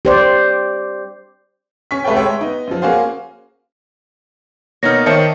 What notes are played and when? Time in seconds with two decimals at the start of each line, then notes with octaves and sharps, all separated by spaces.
0.05 G4 C5 D5
1.91 C#4 C#6 B6
2.04 C2 A3 B4 C#5 G5
2.17 G#3 C#5 E5 G5
2.41 B3 D#4
2.67 F#2 F3
2.82 A#3 C#4 F#4 G#4 C5 F5
4.83 B2 A#3 B3 D#4 C#5 F6 A#6
5.06 D#3 C5 C#5 D#5 E5 A5 C#7